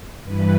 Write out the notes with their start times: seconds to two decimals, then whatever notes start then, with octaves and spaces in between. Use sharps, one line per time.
0.24 G2 E3 B4